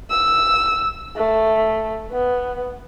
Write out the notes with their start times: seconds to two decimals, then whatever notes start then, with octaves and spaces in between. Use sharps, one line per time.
0.10 E6
1.17 A3
2.12 B3